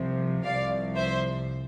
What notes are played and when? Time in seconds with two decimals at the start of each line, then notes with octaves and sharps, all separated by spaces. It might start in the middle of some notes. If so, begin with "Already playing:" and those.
Already playing: C2 C3 F3
0.44 C2 C3 F3 D5 F5
0.96 C5 E5